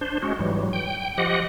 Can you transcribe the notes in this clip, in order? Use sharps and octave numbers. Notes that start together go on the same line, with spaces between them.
D4 C5
G#3 C#4 F#4
G#2 E3 F#3 G3
G5
F3 G4 D#5 F#5